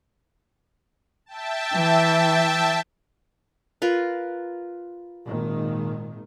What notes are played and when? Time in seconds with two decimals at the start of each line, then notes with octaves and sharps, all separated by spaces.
1.26 E5 G5 A5
1.74 E3
3.82 F4 A#4 B4
5.25 G#1 A#2 D#3